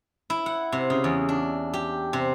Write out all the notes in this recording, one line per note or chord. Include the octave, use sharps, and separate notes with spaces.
E4
F#5
C3
C#3
E2
D4
G4
C3